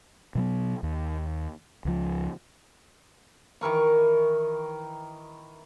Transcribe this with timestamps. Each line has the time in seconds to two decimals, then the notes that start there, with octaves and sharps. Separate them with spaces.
0.35 B2 F#3 B3
0.83 D#2
1.85 C#2 F3
3.61 D#3 E3 A#4 C#6